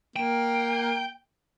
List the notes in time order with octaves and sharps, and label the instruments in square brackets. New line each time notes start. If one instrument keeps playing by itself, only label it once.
[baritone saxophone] A#3 [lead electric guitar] G5